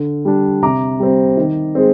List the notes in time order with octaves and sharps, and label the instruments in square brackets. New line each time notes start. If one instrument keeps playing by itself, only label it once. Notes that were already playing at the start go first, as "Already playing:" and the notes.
Already playing: [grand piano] D3
G3 D4
C3 A#5 D6
G3 C4
D#3
G#3 C4